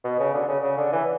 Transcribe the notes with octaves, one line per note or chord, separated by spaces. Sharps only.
B2
C#3
D3
C#3
C#3
D3
E3